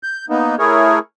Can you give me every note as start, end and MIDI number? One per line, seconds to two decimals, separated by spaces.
0.03 0.25 91
0.30 0.55 58
0.30 0.55 59
0.30 0.55 63
0.59 0.99 57
0.59 0.99 64
0.59 0.99 68
0.59 0.99 70
0.59 0.99 73